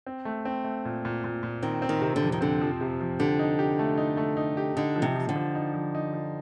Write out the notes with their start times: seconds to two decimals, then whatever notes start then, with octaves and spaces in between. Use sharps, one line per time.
0.06 C4
0.25 A3
0.45 C4
0.64 A3
0.85 A#2
1.05 A#2
1.24 A#2
1.43 A#2
1.63 D#3 C4
1.82 C4
1.89 D#3
2.02 C3
2.16 D3
2.22 F2
2.32 D#3
2.41 D3 C4
2.61 F3
2.81 C3
3.01 F3
3.20 D3 G4
3.39 D#4
3.59 G4
3.79 A3
3.97 D#4
4.17 A3
4.37 D#4
4.57 G4
4.76 D3 D#4
4.96 F3
5.02 C3
5.16 F3
5.29 D3
5.36 F3
5.55 D#4
5.74 F3
5.95 D#4
6.14 F3